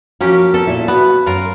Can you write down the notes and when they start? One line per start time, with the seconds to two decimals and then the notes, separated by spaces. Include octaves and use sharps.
0.21 F3 A#3 C#4 F#4 G4
0.54 B3 A4 A#4
0.67 A#2 E4
0.88 B3 F#4
1.26 F#2 F4 A#4